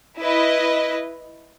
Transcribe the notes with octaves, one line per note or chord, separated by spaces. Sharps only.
E4 B4 D#5